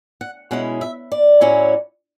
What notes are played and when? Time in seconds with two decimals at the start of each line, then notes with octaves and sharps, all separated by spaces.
0.21 F#5
0.51 B2 G#3 C#4 E4 F#5
0.81 E5
1.12 D5
1.41 A2 F#3 C#4 E4